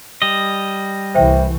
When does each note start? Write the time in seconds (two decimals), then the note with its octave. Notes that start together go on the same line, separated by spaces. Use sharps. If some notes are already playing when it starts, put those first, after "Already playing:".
0.22 G3 D#5
1.15 C2 E3 C5 E5 G5